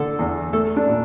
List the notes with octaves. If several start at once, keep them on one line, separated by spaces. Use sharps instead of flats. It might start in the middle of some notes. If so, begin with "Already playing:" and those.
Already playing: D3 A4
E2
A3 A4
D4
A#2